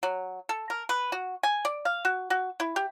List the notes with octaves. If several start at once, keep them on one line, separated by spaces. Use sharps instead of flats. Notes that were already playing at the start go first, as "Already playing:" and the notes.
F#3
A4
A#4
B4
F#4
G#5
D5
F5
F#4
F#4
E4
G4